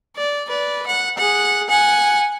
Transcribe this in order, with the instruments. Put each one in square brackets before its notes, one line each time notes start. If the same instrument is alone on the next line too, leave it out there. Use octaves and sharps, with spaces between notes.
[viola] D5
B4 D5
F#5
G#4 F#5
F#5 G#5